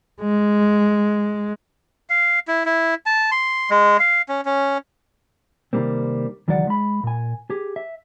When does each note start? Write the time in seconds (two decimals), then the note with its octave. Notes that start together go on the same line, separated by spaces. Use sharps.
0.21 G#3
2.10 F5
2.48 E4
2.66 E4
3.06 A5
3.32 C6
3.70 G#3
3.99 F5
4.29 C#4
4.45 C#4
5.73 C3 D#3 F3 G3 A#3 C4
6.48 C#2 D#3 E3 F#3 D5 F#5
6.67 G#3 B5
7.03 A#2 G#5
7.50 G4 G#4
7.76 E5